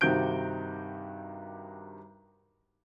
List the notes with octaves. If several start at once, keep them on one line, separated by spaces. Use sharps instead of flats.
G2 C3 D#3 F#4 G6 D7